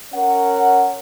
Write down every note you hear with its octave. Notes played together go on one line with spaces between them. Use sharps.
C#4 A#4 C#5 F#5